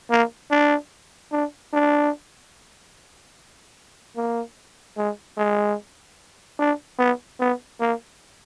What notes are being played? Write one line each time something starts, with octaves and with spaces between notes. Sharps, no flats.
A#3
D4
D4
D4
A#3
G#3
G#3
D4
B3
B3
A#3